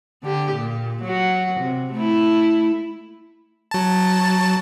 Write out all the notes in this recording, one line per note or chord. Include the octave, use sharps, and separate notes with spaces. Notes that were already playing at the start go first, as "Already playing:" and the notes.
D3 G4
A#2
F#3 F#4
C3
A3 E4
F#3 A5